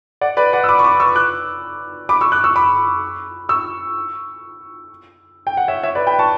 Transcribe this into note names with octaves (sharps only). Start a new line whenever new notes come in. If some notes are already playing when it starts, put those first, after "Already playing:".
D5 F#5
B4 D5
D5 F#5
E6
B5 D6
C#6
B5 D6
C#6 E6
D6 F#6
B5 D6
C#6 E6
D6 F#6
C#6 E6
B5 D6
C#6 E6
G5
F#5
C#5 E5
C#5 E5
B4 D5
G5 B5
A5 C#6